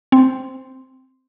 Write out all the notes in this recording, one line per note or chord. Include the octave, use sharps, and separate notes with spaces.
C4